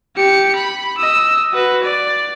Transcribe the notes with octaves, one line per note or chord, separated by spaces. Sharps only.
G4 C#7
B5
D#5 E6
F#4 B4
D5